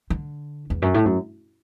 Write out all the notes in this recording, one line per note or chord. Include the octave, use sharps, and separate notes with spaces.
D3
E2
F#2
A2
F#2